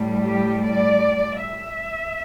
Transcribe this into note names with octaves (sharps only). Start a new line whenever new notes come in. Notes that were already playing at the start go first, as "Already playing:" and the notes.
Already playing: A2 G3
G4
D5
E5